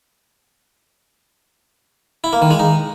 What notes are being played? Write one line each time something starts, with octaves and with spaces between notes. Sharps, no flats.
E4
A#3
D#3
G#3
D#4